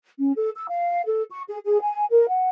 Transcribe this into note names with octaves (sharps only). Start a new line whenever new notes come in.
C#4
A4
E6
F5
A4
C#6
G#4
G#4
G#5
A#4
F#5